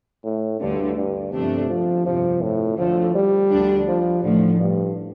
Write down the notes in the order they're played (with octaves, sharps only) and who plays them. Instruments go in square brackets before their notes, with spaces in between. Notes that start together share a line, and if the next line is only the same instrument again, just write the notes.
[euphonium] A2
[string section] D2 D3 A3 [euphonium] G2
[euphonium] G2
[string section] G1 F2 F3 A3 D4 [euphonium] C3
[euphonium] F3
[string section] G1 F2 C3 [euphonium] F3
[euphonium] A2
[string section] D2 D3 A3 [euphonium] F3
[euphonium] G3
[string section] D2 D3 F3 D4
[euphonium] F3
[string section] A1 A2 F3 [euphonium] D3
[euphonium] G2